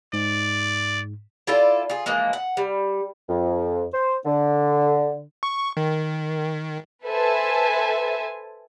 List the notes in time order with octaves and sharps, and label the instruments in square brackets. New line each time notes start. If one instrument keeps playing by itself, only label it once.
[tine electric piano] G#2 [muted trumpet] D5
[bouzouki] E4 F4 A4 D5
F4 G#4
E3 F3 G#3 A#3
F#5
G3
[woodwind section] F2
C5
D3
[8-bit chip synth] C#6
D#3
[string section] A4 B4 C5 E5 G#5 A5